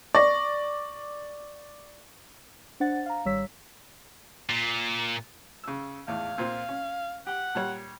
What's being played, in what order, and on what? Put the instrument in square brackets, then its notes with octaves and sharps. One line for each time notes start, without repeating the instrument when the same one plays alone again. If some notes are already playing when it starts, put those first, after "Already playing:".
[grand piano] D5 [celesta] C#6 A#6
[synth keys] D4 C5 F#5 A6
F5 A#5
G#1 G3 C#5 E6 B6
[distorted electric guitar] A#2
[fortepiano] C#3 E6
[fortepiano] G#1 E2 A2 [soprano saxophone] F5
[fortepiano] A#2 C4 F4
C#4
[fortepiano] G4 G5 [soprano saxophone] F#5
[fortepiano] A#2 G3 C#5